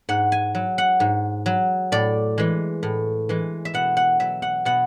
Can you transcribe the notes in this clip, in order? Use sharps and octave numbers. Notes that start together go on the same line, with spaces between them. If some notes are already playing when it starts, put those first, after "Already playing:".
G#2 F#5
G#5
F#3
F#5
G#2
F#3
A2 D5
E3 G#3
A2
E3 G#3
E5
B2 F#5
F#5
F#3 E5
F#5
B2 F#5